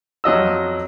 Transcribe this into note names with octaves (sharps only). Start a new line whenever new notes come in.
F2 F#3 D#5 E6